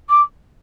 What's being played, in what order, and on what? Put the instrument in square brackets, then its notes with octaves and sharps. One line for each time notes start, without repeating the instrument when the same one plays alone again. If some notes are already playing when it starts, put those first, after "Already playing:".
[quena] D6